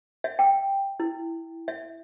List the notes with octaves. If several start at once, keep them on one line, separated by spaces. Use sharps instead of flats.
E5
G5
E4
E5